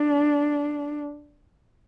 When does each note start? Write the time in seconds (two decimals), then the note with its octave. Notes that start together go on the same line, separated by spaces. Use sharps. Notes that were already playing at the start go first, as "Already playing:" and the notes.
Already playing: D4